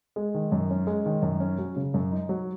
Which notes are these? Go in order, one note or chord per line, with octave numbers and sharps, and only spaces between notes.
G#3
D#3
F#2
C#4
G#3
D#3
F#2
C#4
F#3
C#3
F#2
D#4
F#3